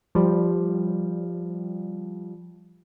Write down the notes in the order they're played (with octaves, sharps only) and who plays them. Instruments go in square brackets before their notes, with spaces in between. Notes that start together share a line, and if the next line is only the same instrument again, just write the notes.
[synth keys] F3 G3